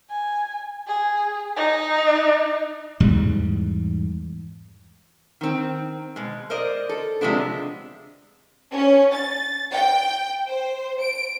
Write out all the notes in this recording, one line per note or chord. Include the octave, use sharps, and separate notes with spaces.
G#5
G#4
D#4
E2 G#2 G3
D#3 C4
B2 G#3
A#4 C5 D5 D#5
A4
C3 F3 G#3 B3 D4
C#4
A6
G5
C5
D7